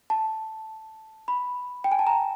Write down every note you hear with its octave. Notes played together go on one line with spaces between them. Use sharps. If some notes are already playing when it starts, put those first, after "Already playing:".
A5
B5
G5
G#5
A5
A#5